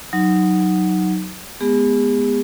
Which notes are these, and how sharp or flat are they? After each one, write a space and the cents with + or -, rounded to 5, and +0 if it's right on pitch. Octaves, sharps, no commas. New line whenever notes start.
F#3 +0 D#4 +0
G#3 +35 B3 +0 G#4 -45